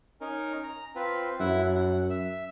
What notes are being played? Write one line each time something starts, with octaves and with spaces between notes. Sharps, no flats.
C#4 D#4 A#4
A#5
C4 F4 B4
F#2 E4 E5 F#5
F#5
E5